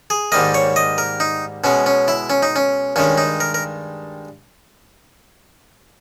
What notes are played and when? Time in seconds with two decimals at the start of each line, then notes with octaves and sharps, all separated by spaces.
0.10 G#4
0.32 G#2 D#3 G3 A#3 D#5
0.54 C#5
0.76 D#5
0.98 A#4
1.20 D#4
1.64 B2 G#3 C#4
1.86 C#4
2.08 E4
2.30 C#4
2.43 D#4
2.56 C#4
2.96 G2 D#3 G#3 C#4
3.18 D#4
3.40 A#4
3.54 A#4